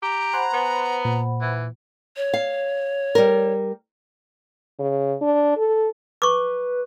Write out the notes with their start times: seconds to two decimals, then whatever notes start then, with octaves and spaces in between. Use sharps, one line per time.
0.02 G4 A#5
0.33 C5 F#5 G#5 B5 C6 F#6
0.53 B3
1.05 A#2
1.41 E3
2.17 C#5
2.34 F5
3.15 G3 A#4
4.79 C#3
5.21 D4
5.57 A4
6.22 B4 C#6 D6